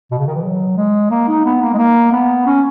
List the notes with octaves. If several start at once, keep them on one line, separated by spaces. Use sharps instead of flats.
B2
C#3
D#3
E3
F#3
G#3
A#3
D#4
B3
A#3
G#3
A#3
B3
C#4